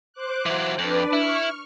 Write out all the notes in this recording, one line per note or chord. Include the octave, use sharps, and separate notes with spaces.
C5 D6 F#6
E3 F#3
F2 D4 B4 D5
E4 C#6 F6